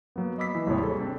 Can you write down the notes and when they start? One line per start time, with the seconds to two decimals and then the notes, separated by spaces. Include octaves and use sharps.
0.16 F#3 A#3 B3
0.38 D#5 B5 D6 E6 B6 C7
0.55 E3
0.66 G#1 D#2 C3 G3 E4 C#5
0.79 G3 G#4 A4
1.00 C4 D4